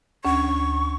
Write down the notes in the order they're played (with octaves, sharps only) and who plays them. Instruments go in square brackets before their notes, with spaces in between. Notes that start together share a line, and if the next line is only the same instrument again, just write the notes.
[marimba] D2 C#4 [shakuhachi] C#6